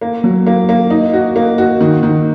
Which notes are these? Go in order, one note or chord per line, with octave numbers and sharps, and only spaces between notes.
A#3
F#3
A#3
A#3
D#4
F#4
A#3
F#4
D#3
D#3